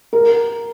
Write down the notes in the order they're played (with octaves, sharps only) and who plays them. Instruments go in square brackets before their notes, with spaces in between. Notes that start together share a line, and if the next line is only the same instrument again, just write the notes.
[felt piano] A#4